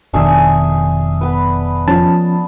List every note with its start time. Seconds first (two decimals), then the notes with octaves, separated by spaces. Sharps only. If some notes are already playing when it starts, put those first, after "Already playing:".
0.13 F1 B2 D#3 D4 G#4 E5
1.21 B3 B4
1.88 F3 C#4 A5